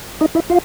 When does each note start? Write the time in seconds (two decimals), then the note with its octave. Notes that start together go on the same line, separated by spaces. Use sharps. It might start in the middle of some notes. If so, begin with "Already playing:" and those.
0.21 D#4 D#5
0.35 E4 E5
0.50 F4 F5